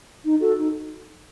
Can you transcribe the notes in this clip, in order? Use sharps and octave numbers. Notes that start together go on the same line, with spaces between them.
D#4
F#4 A4
D#4